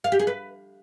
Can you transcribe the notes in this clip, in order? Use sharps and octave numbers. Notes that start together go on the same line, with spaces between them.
F5
G4
G#4
B4